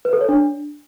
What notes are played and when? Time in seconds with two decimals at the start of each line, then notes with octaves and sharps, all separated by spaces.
0.05 B4
0.13 A4
0.21 C#5
0.29 D4